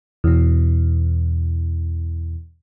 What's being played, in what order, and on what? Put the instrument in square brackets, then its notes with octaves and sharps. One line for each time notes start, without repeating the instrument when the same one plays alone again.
[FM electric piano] E2 B2